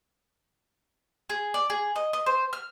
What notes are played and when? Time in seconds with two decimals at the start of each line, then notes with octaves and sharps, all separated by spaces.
1.30 G#4
1.54 D5
1.70 G#4
1.96 D#5
2.13 D#5
2.26 C5
2.53 F6